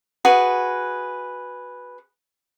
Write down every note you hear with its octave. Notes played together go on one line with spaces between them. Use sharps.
F#4 G#4 B4